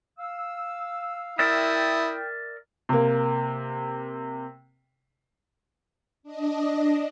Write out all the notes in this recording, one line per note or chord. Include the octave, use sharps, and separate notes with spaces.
F5 E6
E4 A#4 D5 E5 G5 D#6
C3 A#3
D4 D#5